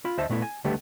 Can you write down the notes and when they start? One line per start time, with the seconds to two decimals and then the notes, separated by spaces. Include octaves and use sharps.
0.05 F4 B5
0.18 D2 C5 D#5 E5 A5
0.29 A#2 A3 B3 E4
0.42 G#5
0.64 C#2 D3 G3 A3 B3 G4